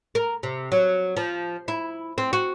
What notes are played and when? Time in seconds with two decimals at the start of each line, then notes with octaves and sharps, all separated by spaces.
0.15 A#4
0.43 C3
0.72 F#3
1.17 F3
1.68 E4
2.18 C4
2.33 F#4